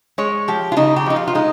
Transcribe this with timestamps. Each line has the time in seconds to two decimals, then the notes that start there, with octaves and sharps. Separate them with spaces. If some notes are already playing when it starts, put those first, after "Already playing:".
0.18 G#3 C#5
0.48 F3 G4
0.72 F4
0.77 C#3 D#4
0.96 G4
1.06 F3 D#4
1.16 F4
1.27 F4
1.35 G#3 D#4